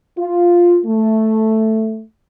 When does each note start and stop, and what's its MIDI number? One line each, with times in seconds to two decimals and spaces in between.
0.18 0.79 65
0.86 2.01 57